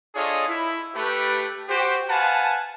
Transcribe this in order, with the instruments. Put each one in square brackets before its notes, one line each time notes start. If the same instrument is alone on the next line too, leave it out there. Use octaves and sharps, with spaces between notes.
[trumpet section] D4 F4 G#4 A4 C#5 D#5
E4
A3 G4 B4
F#4 G4 C5
B4 F5 F#5 G#5 A5